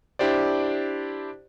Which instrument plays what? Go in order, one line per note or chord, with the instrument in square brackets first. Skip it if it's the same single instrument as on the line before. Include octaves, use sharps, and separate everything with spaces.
[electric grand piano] D4 E4 G4 C5 D5